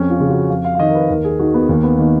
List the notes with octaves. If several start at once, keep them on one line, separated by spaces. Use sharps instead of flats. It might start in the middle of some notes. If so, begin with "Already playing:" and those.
Already playing: F2 C#4
F4
C#3
F#4
F2 F5
F5
F5
D#3 D#5
A#4
B4
D#2 A#4
G#4
D#3 F#4
B3
D#2 A#3
B3
D#3 A#3